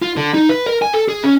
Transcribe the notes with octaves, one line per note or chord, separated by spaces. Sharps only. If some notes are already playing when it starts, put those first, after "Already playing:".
F4
D3
D#4
B4
A#4
G#5
A4
G#4
C#4